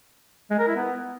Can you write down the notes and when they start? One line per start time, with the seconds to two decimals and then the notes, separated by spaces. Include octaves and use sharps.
0.50 G#3
0.59 A#4
0.67 E4
0.76 B3